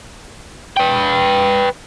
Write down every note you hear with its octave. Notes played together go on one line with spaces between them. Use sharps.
B4 G5